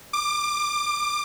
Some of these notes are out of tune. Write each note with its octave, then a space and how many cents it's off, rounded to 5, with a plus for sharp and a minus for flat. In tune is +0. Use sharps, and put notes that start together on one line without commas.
D6 +25